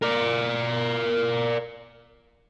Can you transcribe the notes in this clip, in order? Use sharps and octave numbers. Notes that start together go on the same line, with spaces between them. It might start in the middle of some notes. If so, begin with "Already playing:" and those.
A#4 D5